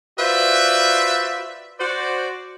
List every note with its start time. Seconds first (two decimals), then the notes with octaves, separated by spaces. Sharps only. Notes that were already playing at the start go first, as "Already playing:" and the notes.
0.18 F4 F#4 B4 C5 D5 E5
1.78 F#4 C5 D5